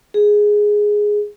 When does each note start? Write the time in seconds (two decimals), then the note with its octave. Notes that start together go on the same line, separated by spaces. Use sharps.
0.14 G#4